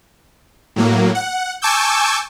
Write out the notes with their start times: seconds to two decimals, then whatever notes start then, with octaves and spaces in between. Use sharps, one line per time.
0.76 A2 F#3 A#3
1.15 F#5
1.62 G#5 A5 C#6 D6 E6 G6